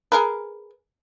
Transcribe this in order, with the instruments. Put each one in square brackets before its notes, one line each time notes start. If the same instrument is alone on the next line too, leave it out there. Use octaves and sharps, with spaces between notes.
[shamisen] G#4 A#4 B4